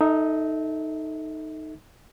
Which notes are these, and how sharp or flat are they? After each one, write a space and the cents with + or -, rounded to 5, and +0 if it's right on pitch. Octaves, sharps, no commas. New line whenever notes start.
D#4 +0 A4 +5 E5 -30